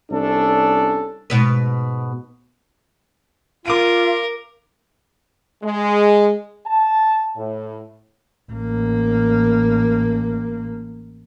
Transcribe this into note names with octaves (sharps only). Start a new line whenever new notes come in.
C2 C#4 D4 A4
G#2 B2 B4
F4 A#4 F5 D6 D7 D#7
G#3
A5
A2
A1 A#3